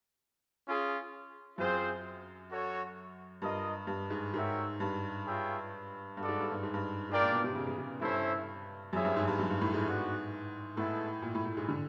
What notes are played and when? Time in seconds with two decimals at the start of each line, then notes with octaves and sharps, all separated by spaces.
0.66 C#4 F4 G#4
1.58 F#2 C4 F4 G#4 C5
2.50 F#4 A4 C#5
3.42 G2 F4 A#4 D#5
3.87 G2
4.10 G#2
4.34 G#2 F#4 A#4 C#5 E5 G5
4.80 G2
5.25 F4 G#4 C#5 E5 G5
6.17 G2 F#4 A4 D5
6.28 G#2
6.40 G2
6.51 G2
6.63 G#2
6.74 G2
7.09 G#2 D4 F4 A#4 D5 G5
7.21 A#2
7.32 B2
7.44 C3
7.55 C#3
7.67 C#3
7.78 C#3
8.01 G2 C#4 E4 A4 C5 E5
8.93 F#2 C4 E4 G#4 C#5 E5
9.05 G2
9.16 G#2
9.28 G2
9.39 F#2
9.50 G2
9.61 A2
9.74 G#2
9.85 B3 D4 F#4
10.76 A2 G#3 B3 E4 A4
11.22 A#2
11.35 A2
11.45 A2
11.57 G#2
11.68 D3